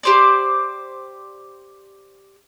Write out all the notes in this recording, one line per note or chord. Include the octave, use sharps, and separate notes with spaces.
G4 C5 D5